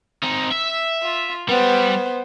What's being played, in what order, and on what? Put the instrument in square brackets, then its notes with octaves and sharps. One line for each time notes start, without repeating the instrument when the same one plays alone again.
[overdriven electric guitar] C4 D#4
E5
[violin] F4
[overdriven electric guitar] G3 [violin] B3 C5